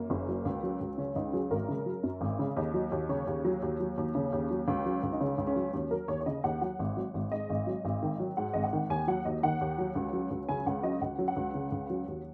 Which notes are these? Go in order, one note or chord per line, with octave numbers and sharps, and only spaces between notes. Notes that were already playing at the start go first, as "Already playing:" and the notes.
Already playing: F#2 A#3
F#1
F#3
C#2
F#3
C#2
C#3 C#4
C#2 D#4
F#3 G#4
G#1 A#4
C#3
F#3
F#2
G#1
C#3
D#2 D#5
F#3
D#2
C#3 C#5
D#2
F#3
D#2
F#3
D#2
C#3 C#4
D#2
F#3
C#2
F#3
C#2
D#4
C#3 C#4
C#2
C#4
F#3
D#2 C#4
F#3 A#4
D#2 C#5
C#5
C#3 D#5
D#2 F#5
F#3 F#5
G#1
F#3
G#1
G#2 D#5
G#1
F#3
G#1
D#3
F#3
G#2 F#5
G#1 D#5
F#5
D#3
D#2 G#5
F#3 F#5
D#2 D#5
D#3 F#5
D#2
F#3
C#2
F#3
C#2
C#3 G#5
C#2 F#5
F#3 D#5
C#2 F#5
F#3
F#5
C#2
C#3
C#2
F#3
D#2